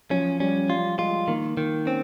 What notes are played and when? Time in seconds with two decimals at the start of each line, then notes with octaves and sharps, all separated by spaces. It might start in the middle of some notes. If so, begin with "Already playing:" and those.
0.11 F3 C#4
0.40 G3 C#4
0.69 G3 F4
0.99 G#3 F4
1.28 D#3 A#3
1.57 D#3
1.86 C4 C#4